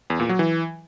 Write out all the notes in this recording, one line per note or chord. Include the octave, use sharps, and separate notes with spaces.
E2
A#2
F#3
E3